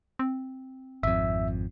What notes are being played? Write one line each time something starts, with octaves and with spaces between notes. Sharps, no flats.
C4
G#1 F2 E5